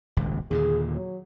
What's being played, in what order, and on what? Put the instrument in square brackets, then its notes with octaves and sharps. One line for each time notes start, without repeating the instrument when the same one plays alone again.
[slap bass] D#1 G#1 C#2
[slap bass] D#2 A#2 D3 [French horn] G#4
[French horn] F#3